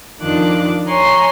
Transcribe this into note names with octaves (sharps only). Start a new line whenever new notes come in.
F2 D#3 D4 F4 D6 F#6
C#5 G#5 A#5 C6 C#6